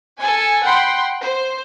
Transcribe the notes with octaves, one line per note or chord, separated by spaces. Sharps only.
A4 G#5
F#5 G5 B5 C6
C5